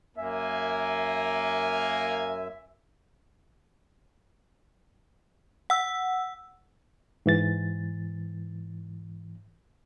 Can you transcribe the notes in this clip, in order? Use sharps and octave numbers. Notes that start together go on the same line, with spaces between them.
F#2 A#3 E5 G#5
F#5 E6
G#2 E3 A6